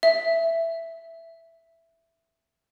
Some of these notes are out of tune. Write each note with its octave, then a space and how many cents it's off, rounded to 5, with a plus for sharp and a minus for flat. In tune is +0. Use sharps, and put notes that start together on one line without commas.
E5 +5